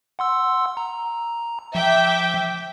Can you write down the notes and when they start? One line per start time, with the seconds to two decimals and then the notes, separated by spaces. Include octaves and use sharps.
0.19 F#5 C6 E6
0.77 A#5
1.75 F3 E5 G5 D6